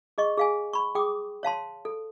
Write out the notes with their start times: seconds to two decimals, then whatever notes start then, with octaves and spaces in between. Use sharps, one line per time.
0.18 G#4 D#5 C#6
0.37 G#4 F5 G#5
0.73 B5 C#6
0.95 G#4 G5 D6 D#6
1.43 C#5 F5 A5 C6
1.85 A4